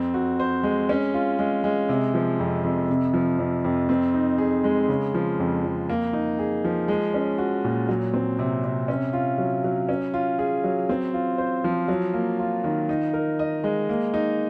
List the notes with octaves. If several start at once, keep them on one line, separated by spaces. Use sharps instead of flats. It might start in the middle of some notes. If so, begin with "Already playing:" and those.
Already playing: F2 C4
F#4
C5
G#3
C#4
F4
G#3
G#3
C3
F3
F2
F2
C3
F3
F2
F2
C4
D#4
G#4
G#3
C#3
F3
F2
F2
A#3
D#4
G#4
F3
G#3
C#4
F#4
A#2
F#3
C4
C3
C3
C#4
F4
F#3
F#3
C#4
F4
G#4
F#3
C4
F4
C5
F3
F#3
A#3
F4
D#3
D#4
A#4
D#5
G#3
A#3
D#4